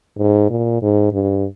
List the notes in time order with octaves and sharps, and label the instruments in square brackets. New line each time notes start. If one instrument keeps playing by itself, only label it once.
[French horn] G#2
A#2
G#2
G2